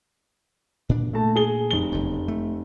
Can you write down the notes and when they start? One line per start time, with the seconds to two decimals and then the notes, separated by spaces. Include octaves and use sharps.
0.89 A#2 D4
1.13 A3 A5
1.36 G#4 G7
1.71 F1 G7
1.92 F#1 F2
2.28 A3